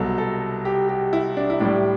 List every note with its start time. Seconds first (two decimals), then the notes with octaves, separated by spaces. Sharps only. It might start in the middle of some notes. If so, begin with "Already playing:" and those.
Already playing: C2 B2 F#3 A4
0.18 A4
0.65 G4
0.89 G4
1.13 E4
1.37 D4
1.50 E4
1.60 A2 G3 D4